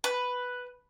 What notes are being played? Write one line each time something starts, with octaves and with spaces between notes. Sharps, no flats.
B4